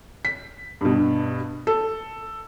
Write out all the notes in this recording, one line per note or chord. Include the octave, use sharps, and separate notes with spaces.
B6
G2 B2
A4